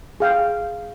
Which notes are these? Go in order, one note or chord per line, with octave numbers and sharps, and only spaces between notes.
G#4 F5 G5